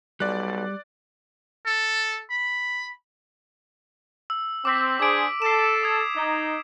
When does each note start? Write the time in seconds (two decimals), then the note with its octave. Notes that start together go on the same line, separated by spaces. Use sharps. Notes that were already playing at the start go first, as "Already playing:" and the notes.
0.20 B1 G3 D5 F#6
1.66 A4
2.30 B5
4.30 E6
4.65 C4 D6 E6 B6
5.00 D4 G#4 C5 D6 D7
5.42 A4 C7 E7
5.83 D#6 G#6
6.17 D#4